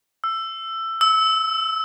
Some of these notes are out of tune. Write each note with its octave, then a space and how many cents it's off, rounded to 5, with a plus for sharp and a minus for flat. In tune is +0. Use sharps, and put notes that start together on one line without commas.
E6 +15
E6 -20